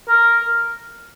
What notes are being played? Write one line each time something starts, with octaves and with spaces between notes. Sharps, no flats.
A#4